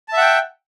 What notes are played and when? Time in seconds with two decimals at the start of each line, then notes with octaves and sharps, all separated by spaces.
0.09 A5
0.13 E5
0.17 F#5
0.21 G5